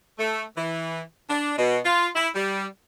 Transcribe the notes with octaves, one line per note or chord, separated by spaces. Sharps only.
A3
E3
D4
B2
F4
E4
G3